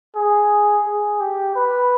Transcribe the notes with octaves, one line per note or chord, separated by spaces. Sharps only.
G#4
G#4
G4
B4